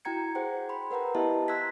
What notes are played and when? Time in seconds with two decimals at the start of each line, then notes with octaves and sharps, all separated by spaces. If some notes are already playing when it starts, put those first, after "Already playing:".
0.05 E4 F#4 G5 A#5 G#6 C#7
0.35 G#4 C5 F#5 G5
0.69 B5 C6
0.91 A#4 B4 F#5 G5 A#5
1.15 B3 E4 G4 D#5 E5 A5
1.48 A#5 C6 E6 F#6 G#6 B6